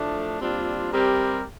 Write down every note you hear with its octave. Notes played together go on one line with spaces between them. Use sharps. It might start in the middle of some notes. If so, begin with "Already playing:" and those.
Already playing: A2 F3 A3 D4
A#2 G3 C4 D4 F4
C3 G3 C4 G4 A#4